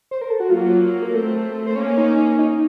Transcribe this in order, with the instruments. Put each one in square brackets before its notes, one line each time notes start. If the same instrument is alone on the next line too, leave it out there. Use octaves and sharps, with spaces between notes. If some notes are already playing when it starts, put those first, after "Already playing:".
[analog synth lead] C5
A#4
A4
F#4
[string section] F#3 A#3 [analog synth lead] F4
[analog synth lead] A#4
[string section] A3 C4 [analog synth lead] A4
[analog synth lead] C5
[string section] A#3 C#4 [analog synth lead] C#5
[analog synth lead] D#4
D#4